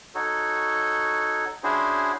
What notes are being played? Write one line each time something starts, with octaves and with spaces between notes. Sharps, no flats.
D#4 F#4 A4 C#5
C#4 D4 E4 F#4 G#4 C5